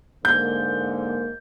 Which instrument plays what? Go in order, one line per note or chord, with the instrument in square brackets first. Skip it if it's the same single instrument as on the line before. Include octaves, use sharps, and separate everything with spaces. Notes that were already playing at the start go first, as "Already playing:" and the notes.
[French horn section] G#2 D3 A#3 [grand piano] G6